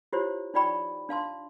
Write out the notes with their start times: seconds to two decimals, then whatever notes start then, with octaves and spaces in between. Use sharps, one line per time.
0.13 E4 F4 G4 C5 C#5
0.54 D#4 F4 D5 G5 B5 C#6
1.09 D4 F5 A5 C6